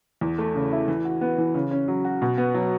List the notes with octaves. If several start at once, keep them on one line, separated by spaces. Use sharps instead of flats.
E2
A3
C#3
E4
E3
F#4
B3
E3
C#3
C#4
F#3
F#4
B2
B3
F#3